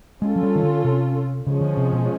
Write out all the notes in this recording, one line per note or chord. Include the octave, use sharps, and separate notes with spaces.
G#3 C#4 F4 A4
F#3
G3
D#3
D3
C3
C#3 F3 G#3 C#4
D3
C3
B2